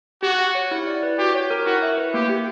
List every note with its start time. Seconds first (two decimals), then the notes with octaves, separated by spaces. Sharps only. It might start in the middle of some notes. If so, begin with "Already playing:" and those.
0.23 F#4 G4
0.39 F#5
0.55 C#5
0.71 E4
0.87 D5
1.03 B4
1.18 F#4 G4
1.34 C#5
1.50 A#4
1.65 E4 F#4
1.82 E5
1.97 B4
2.13 A#3 G4
2.29 G4